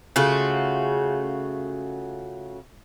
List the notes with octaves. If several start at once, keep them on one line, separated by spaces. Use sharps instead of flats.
C#3 A3 F4 F#4